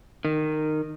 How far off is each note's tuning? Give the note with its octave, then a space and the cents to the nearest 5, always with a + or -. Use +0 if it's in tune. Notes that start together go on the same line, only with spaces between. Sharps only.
D#3 -15